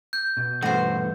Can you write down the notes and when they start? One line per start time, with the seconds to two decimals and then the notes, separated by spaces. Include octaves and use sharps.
0.13 G6
0.37 B2
0.62 E2 G2 A3 F#4 C5